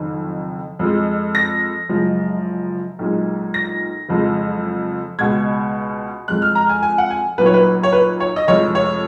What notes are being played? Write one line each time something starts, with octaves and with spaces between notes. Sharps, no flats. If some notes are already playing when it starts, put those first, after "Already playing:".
Already playing: F#1 F2 D#3
F2 F3 G#3
A#6
F#1 F#2 F3 G#3
B1 A#2 G#3
A#6
F#1 F2 F3 G#3
C#2 B2 G#3 G#6
F2 F3 G#3 F#6
F6
A#5
G#5
G#5
F#5
G#5
B1 A#2 F#3 B4
C#5
B4
C#5
B4
C#5
D#5
F1 F2 F3 G#3 C#5
C#5